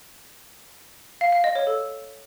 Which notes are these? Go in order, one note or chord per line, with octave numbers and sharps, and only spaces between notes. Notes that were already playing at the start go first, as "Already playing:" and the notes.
F5
F5
D#5
C#5
A4